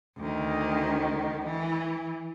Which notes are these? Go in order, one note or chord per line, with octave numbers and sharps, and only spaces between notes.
D2 D#3
E3